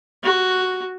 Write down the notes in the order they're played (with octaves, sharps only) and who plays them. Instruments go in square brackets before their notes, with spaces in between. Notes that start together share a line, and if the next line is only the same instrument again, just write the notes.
[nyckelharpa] F#4